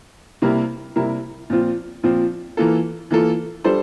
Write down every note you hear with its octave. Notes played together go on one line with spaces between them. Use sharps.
C3 G3 A#3 E4 A#4
C3 G3 A#3 E4 A#4
A#2 F3 C4 F4
A#2 F3 C4 F4
E3 A#3 F4 A4
E3 A#3 F4 A4
G3 D4 A4 C5